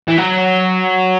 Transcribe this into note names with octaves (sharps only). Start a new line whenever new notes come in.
E3
F#3